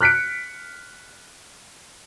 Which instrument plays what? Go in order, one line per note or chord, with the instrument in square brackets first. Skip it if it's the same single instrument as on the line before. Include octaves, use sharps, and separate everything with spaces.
[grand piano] F6 F#6 B6 C#7 D7